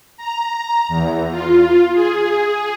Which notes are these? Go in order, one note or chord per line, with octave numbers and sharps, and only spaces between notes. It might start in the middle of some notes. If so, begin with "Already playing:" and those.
A#5
E2
F4
G#4